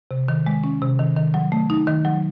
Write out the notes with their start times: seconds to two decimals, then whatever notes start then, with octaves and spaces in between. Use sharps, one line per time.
0.11 C3
0.28 D#3
0.46 G#3
0.64 C#4
0.82 C3
0.99 D#3
1.17 D#3
1.34 F#3
1.52 A3
1.70 D#4
1.87 D#3
2.05 F#3